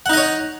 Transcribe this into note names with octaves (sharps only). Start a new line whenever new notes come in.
D#4 C#5 D#5 F#5